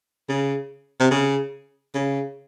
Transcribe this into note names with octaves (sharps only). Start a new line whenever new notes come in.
C#3
C3
C#3
C#3